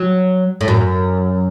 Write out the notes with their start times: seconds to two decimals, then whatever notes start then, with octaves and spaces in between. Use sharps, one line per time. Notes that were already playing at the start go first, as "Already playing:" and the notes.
Already playing: F#3
0.61 A2
0.68 F#2